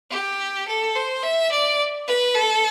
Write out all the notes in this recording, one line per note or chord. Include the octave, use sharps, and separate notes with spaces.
G4
A4
C5
E5
D5
B4
A4